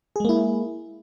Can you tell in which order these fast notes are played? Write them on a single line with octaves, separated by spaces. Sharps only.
G#4 G#3 A#3 E4